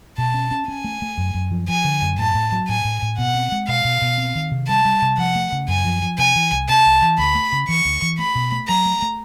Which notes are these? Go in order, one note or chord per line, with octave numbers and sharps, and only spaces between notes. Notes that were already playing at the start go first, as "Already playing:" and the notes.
B2 A5
C#4
C#4
C#4 G#5
A3
A3
F#2
F#2
F3
F3 G#5
D3
F#2
A2 A5
A2
F#3
A2 G#5
A2
A2
B2 F#5
C4
G#3
B2 F5
B2
B2
C4
D#3
C3
G3 A5
G3
C3
F3 F#5
A3
C#3
F#2 G#5
F3
F3
C3 G#5
E3
C2
C3 A5
C2
E3
D2 B5
A3
C#3
E3 C#6
D2
E3
A3 B5
B2
A3
F#3 A#5
A3
A3